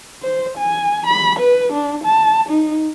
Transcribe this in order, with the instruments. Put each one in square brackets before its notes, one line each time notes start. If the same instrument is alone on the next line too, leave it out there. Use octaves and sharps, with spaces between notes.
[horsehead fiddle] C5
G#5
B5
B4
D4
A5
D#4